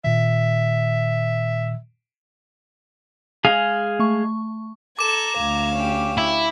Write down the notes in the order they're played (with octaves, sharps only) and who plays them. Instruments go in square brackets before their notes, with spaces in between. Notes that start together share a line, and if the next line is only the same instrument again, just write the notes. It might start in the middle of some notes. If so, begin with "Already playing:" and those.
[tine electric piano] A#2 D#3 [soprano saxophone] E5
[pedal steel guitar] G#3 G#4 F5
[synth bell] A3 C#6
[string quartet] A4 [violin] A#5 G#6 [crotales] D6 E7
[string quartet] D2 F5
[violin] C#4 G4
[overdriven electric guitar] E4